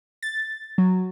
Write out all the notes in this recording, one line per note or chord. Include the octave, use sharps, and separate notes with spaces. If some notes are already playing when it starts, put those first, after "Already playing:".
A6
F#3